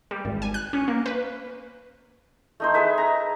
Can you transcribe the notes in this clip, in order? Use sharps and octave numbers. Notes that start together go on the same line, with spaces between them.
G3
G#1
G#5
F#6
C#4
A#3
B4
A3 D#4 C5
G#4 A4 B4 E5
A#5